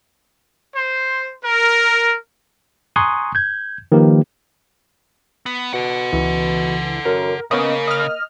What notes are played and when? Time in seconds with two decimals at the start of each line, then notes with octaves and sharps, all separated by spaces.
0.76 C5
1.44 A#4
2.96 G#5 A#5 C6 C#6 D#6 F#6
3.35 G6 G#6
3.92 D#3 F3 A#3 G4 A#4 B4
5.46 B3
5.73 B2 A4 F#5
6.13 C#2 B2 E3
7.05 F#2 A#4
7.51 C#3 A#3 B3 C#4 D#5
7.87 D#5 F6